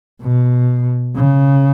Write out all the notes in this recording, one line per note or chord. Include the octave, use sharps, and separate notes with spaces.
B2
C#3